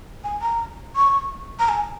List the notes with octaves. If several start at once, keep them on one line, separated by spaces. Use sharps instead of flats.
G#5
A#5
C#6
A#5
G#5